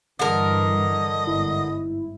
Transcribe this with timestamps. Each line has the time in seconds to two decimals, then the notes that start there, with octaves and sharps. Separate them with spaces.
0.19 G2 D3 E3 A#4 D#5
1.27 G1 G#2 E4